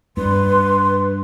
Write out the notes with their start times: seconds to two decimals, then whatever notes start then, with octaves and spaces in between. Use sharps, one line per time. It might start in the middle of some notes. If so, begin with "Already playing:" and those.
0.17 G2 B4 C6